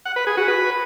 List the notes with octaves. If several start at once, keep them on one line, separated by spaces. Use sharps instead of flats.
F#5
B4
G#4
F#4
B4